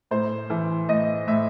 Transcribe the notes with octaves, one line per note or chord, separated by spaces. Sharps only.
A2 C5
E3
A2 D#5
A2 E5